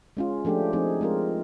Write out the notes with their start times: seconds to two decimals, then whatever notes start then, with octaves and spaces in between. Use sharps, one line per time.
0.17 G#3 C#4 F4
0.45 F3 A3 D4 G4
0.73 F3 A3 C4 D#4 G#4
1.01 G#3 C4 F4 A#4